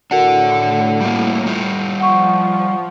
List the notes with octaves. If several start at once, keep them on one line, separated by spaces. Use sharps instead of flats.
A2 D4 F#4 A4 A#4 F#5
G3 A#3
G3 F4
F3 F#5 C#6